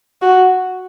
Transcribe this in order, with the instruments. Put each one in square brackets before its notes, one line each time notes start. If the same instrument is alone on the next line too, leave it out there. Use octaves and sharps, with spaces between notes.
[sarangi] F#4